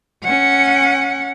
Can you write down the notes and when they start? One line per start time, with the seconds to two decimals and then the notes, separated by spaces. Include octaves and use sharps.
0.24 C#4 F#5